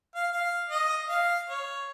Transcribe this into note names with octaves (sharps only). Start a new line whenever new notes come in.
F5
F5
D#5
F5
C#5